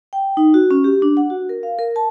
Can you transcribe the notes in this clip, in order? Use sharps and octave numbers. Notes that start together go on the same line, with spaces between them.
G5
D#4
F#4
C#4
G4
D4
F#5
F#4
A#4
F5
A#4
A5